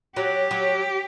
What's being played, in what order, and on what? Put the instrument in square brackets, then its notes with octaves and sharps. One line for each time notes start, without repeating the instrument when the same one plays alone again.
[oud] F#3 [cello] G4
[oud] F#3